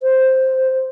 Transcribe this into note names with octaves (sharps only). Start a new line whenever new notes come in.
C5